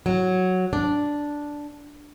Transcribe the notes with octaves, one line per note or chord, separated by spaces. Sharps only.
F#3
D4